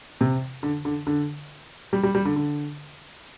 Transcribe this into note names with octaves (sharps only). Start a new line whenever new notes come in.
C3
D3
D3
D3
G3
G3
G3
D3
D3